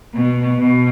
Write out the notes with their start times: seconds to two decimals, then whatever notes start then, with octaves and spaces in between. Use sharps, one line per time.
0.14 B2
0.58 B2